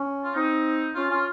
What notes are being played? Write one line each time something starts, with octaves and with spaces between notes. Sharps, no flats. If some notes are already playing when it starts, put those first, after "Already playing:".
Already playing: C#4
F4
C4 D#4
C#4 F4
C#4 F4